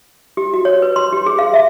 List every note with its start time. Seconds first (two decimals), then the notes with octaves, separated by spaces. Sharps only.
0.37 G4
0.54 F#4
0.65 C#5
0.82 B4
0.96 C6
1.13 G4
1.26 G#4
1.39 F5
1.54 E5